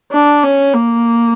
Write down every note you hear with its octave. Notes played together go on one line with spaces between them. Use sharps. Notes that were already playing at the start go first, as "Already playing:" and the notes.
D4
C#4
A#3